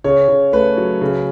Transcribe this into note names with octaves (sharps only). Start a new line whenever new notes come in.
C#3 C#5
C#3
A3 B4
F#3
C#3